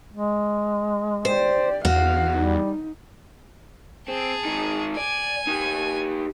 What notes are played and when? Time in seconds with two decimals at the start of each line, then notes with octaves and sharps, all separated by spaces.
0.13 G#3
1.25 G4 C5 D5
1.85 E2 F#4 F5 F#5
2.37 G3 D#4
4.08 C4 G#4 A5
4.45 D#3 G#3
4.97 D5 G#5
5.47 D#4 G4